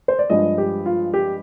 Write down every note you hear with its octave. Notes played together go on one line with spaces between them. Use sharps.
C5
D5
G2 F3 G#3 D#5
G4
F4
G4